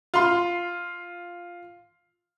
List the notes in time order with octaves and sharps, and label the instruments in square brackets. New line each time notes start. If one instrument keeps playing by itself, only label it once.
[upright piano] F4 C6